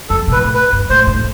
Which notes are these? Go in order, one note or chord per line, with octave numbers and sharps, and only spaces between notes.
F2 A4
B2
A2 B4
B4
G2
A2 C5
A2